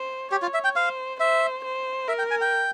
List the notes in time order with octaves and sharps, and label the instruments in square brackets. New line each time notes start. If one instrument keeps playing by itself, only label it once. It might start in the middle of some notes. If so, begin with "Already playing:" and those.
Already playing: [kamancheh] C5
[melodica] G4 [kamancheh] C#5
[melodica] F4
E5
G5
[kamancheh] C5 [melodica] F5
[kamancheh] C5 [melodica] E5
[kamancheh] C5
[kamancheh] A#4 [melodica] E5
[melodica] G5
G#5
G5